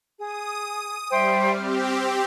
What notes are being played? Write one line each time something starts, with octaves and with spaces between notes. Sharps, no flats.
G#4 D#6
G3 C5 E5 G5
C4 G4 F6